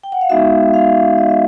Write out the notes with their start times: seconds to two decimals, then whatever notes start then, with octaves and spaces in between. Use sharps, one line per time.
0.03 G5
0.12 F#5
0.21 F5
0.29 G#3 B3 D#4 F#4 E5
0.74 F5
1.18 D#5
1.29 E5